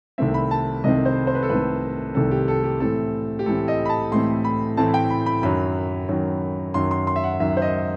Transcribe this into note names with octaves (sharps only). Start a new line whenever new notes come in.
C2 C3 D#3 A3 C4 E5
B5
A5
C2 C3 D#3 A3 C4 D#5
C5
C5
B4
A4
C2 C3 D#3 A3 C4 B4
C2 C3 D#3 A3 C4 A4
G4
A4
G4
A2 E3 A3 C4 A4
G4
A2 E3 A3 C4 A4
D#5
B5
A5
A2 E3 A3 C4 C6
B5
A2 E3 A3 C4 A5
G5
B5
B5
F#2 D#3 F#3 B5
F#2 D#3 F#3
F#2 D#3 F#3 C6
C6
C6
E5
F#5
F#2 D#3 F#3 E5
C5
D#5